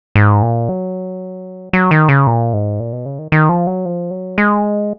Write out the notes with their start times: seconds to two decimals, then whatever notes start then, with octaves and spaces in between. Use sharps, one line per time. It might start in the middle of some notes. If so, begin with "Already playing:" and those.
0.15 G#2
0.42 A#2
0.69 F#3
1.73 F#3
1.91 D#3
2.09 C#3
2.27 A#2
2.53 G#2
2.80 A#2
2.93 B2
3.06 C#3
3.19 D#3
3.32 D#3
3.49 F3
3.67 F#3
3.86 F3
4.11 F#3
4.38 G#3